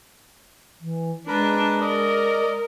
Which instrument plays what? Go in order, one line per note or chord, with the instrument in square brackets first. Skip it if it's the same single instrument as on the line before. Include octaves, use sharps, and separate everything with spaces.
[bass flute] E3
[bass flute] G#3 [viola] D4 [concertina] A#4 B4
[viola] A#4 [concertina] D5 D#5